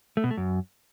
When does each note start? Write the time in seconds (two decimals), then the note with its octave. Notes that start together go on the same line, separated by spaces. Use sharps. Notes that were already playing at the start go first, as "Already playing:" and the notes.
0.17 A3
0.24 B2
0.31 A3
0.37 F#2